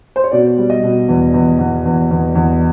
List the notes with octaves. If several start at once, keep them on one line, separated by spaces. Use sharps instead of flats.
C5
C#5
B2 D5
G3
D#5
B2
E2
E2
E2
E2
E2
E2